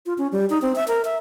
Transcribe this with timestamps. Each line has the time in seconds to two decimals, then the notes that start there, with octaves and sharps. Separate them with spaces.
0.06 F4
0.18 C#4
0.32 G3
0.50 D#4
0.62 C4
0.76 E5
0.88 A#4
1.05 E5